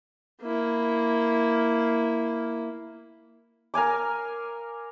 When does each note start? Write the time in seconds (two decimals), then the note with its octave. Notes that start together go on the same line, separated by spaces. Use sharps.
0.42 A#3 E4
3.74 A#4 F5 G#5 D6